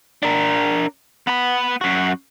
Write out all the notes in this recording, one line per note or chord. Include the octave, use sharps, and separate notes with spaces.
D4 A#4
B3 B5
F#2 F#4